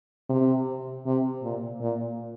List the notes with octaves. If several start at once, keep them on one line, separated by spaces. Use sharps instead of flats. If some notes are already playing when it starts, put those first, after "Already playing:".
C3
C3
A#2
A#2